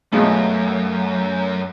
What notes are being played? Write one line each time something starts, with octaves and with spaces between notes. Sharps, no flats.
F#2 B2 G#3 A3 F4